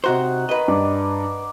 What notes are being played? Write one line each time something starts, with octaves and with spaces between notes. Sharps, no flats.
C3 D#4 F#4 C5 C#5 F#5
D#3 B4 D#5
G2 D5